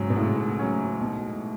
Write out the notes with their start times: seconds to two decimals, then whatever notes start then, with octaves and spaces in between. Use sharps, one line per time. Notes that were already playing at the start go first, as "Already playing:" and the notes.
Already playing: G#2 C#3 F#3 C#4
0.10 B2
0.16 A2 C#3
0.59 F#3 C#4
1.01 B2